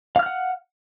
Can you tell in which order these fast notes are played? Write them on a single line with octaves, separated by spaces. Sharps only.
F5 F6 F#6 F#5